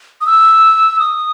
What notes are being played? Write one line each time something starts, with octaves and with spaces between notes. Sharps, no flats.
D#6
E6
D#6